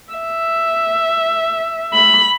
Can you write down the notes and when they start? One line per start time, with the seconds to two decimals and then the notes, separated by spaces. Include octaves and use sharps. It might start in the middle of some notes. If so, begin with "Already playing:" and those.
0.13 E5
1.93 B5